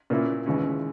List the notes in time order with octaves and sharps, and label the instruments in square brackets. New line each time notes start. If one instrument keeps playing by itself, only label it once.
[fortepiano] A#2 A#3 C#4 E4
D#2 C#3 E3 G#3 C#4